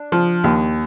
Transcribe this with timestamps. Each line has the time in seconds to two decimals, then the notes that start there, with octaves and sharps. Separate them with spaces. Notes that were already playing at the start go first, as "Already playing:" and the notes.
Already playing: D4
0.12 F3
0.44 D#2